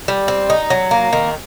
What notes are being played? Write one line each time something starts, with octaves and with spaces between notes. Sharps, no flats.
G3
C4
D#4
F#3
A#3
D#3